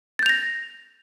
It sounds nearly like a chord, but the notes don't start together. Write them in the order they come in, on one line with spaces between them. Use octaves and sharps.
A6 G6 F7 A#6